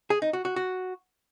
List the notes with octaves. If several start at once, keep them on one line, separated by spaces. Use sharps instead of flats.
G#4
D#4
F#4
F#4
F#4